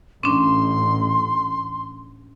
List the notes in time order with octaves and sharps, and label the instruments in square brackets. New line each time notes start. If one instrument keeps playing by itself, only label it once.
[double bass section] A1 [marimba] C#4 D4 [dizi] C6